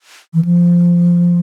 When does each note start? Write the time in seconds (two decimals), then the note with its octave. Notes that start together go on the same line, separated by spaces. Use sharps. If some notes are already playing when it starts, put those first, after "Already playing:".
0.34 E3
0.45 F3